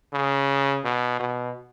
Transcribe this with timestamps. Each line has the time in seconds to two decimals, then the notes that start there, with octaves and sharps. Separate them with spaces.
0.13 C#3
0.85 B2
1.20 B2